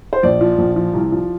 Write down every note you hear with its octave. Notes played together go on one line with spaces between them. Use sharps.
C5
A#1 D5
F3
A#1
F3
C2
F3